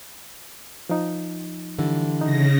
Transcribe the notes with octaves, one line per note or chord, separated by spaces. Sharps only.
F3 D#4
D3 E3 G3
C#3 D#4 A#6